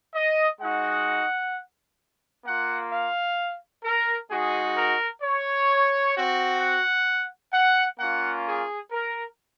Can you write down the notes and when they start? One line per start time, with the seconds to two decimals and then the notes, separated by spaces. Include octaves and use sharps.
0.14 D#5
0.60 G#3 D#4 F#4 F#5
2.45 A#3 F4 F#5
2.91 F5
3.84 A#4
4.30 G#3 D#4 F#4 G#4
4.75 A#4
5.23 C#5
6.15 C4 F#4
6.60 F#5
7.52 F#5
7.99 A#3 C#4 F4 F#5
8.46 G#4
8.91 A#4